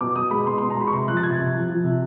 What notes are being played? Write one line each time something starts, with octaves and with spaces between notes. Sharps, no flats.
B2 D6
B2 D#6
G#3 B5
B2 C6
C6
B2
A#5
G#3 B5
C#6
C3 C6
F3 F#6
A6
C3 G#6
C3
F3
F3
C3